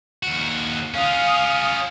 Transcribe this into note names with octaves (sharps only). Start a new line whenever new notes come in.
D#2 F#4
C#4 F4 F5 D#6